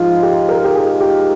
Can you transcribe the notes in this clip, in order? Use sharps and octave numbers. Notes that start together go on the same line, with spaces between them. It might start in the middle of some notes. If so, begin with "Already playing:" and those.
Already playing: G#2 F3 G#3 D#4 F4
G4
A#4
G4
G#4
G4